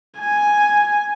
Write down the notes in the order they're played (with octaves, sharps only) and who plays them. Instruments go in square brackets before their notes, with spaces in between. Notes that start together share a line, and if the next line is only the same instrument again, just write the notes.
[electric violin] G#5